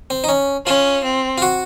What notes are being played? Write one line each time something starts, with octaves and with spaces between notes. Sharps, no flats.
C4
D#4
C#4
C#4 F4
C4
F4
F#4